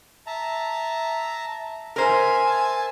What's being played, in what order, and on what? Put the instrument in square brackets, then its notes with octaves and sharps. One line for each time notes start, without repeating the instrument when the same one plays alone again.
[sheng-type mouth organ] E5 A5 A#5
[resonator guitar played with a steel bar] A#4 C5 [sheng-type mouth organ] E5 [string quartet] G#5
[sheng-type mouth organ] A5 E6